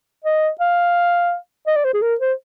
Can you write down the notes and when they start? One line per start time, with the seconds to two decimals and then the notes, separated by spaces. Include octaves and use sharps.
0.24 D#5
0.61 F5
1.67 D#5
1.76 D5
1.84 C5
1.94 G#4
2.02 A#4
2.21 C5